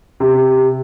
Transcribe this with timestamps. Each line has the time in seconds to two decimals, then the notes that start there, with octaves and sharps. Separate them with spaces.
0.20 C3